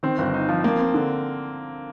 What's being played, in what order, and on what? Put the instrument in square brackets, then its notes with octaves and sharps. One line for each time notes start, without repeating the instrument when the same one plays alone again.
[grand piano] D#3 [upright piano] C4
[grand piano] G1
D#4
F3
[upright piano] A#3 [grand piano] C4
[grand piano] C4
D3